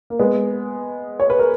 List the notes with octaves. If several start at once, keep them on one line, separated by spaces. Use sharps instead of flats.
A#3
G#3 B3
C#5
B4
A#4